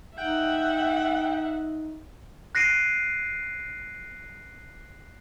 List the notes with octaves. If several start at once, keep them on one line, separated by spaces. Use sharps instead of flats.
D#4 E5 F#5 G5
F#6 A#6 C7 D7 D#7